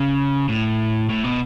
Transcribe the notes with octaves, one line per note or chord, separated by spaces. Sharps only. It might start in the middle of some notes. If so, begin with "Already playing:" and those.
Already playing: C#3
A2
A2
B2